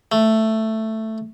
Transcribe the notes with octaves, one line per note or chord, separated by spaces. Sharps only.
A3